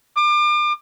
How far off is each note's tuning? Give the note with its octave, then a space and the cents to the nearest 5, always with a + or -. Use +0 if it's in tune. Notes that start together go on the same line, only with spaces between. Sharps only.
D6 +35